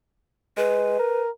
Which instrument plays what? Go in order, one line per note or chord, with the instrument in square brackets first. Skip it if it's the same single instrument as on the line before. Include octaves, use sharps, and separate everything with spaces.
[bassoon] G#3 [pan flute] B4
[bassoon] A#4